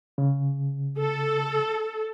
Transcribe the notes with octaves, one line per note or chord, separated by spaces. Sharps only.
C#3
A4